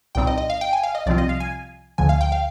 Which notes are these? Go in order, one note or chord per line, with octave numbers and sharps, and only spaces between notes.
C2 A#2 G3 C4 D#4 G5
D#5
D#5
F5
G5
G#5
F5
D#5
C2 C3 F3 C4 F4 D5
D#5
F5
G#5
D2 D3 F3 G#5
F5
G5
F5